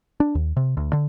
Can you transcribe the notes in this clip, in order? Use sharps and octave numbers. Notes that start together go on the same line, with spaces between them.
D4
D#2
C3
D2
D3